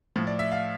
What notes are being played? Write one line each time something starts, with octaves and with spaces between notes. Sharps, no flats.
A2 F3
D5
E5
F5